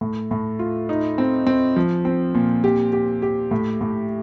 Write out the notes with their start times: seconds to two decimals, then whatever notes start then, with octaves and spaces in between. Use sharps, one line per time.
0.01 A2
0.31 A2
0.59 F4
0.89 D#4
1.18 C4
1.47 C4
1.76 F3
2.05 C4
2.34 A#2
2.64 G4
2.93 G4
3.22 G4
3.51 A2
3.81 A2